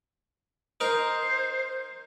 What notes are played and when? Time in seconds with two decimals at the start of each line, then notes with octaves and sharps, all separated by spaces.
0.80 D#4 A#4 C5